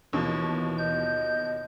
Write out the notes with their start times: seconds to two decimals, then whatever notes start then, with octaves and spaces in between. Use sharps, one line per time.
0.13 D#2 B2 E3 F3 C#6
0.78 D#5 G6